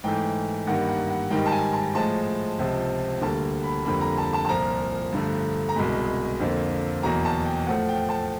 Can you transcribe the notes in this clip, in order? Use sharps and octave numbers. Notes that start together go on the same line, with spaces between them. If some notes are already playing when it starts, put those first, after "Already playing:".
G#2 E3 A3 G5
G2 D#3 G3 A#3 F#5
F#5
F#5
G#2 D#3 G3 G5
A5
G#5
A5
A2 F3 G#3 A5
C#2 C3 F3
D2 D3 G3 A#3 A5
B5
F2 D3 G3 A#3 B5
A#5
A5
A5
A5
C2 A#2 F3 A#5
G2 D3 F3 A3
A#5
C2 B2 G#3 B5
F2 D3 F3 A#3
E2 B2 F#3 A#3 A#5
A5
G5
A2 F3 A3 F#5
G5
A5